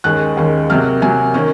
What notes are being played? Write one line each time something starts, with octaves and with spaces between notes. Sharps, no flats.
D#2 D#3 G#3 C#4 F#6
D#2 D#3 G#3 C#4
C3 F#3 A#3 F6
C3 F#3 A#3 G#5
D#3 A#3 C#4